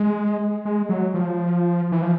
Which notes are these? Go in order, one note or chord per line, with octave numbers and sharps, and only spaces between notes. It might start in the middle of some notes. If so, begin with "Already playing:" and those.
Already playing: G#3
G#3
F#3
F3
E3
F3